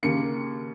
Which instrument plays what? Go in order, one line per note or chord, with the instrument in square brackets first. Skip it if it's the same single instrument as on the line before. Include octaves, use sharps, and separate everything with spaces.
[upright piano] D#2 C#3 A#3 C#7